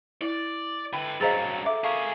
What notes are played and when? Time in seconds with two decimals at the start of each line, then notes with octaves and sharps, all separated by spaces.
0.21 E4 D5
0.93 D3 B4 G5 B5
1.21 G2 F#3 G#4 C5 D#5 F5 A#5 A6
1.66 A4 E5 D6
1.84 G#4 A#4 F5 C#6 B6